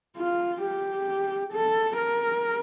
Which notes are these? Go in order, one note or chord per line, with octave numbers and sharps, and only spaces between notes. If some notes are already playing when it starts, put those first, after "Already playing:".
F4
G4
A4
A#4